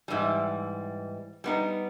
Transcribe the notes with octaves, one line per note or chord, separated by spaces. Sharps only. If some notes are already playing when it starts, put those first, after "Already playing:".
G#2 E3 G3
G3 B3 D#4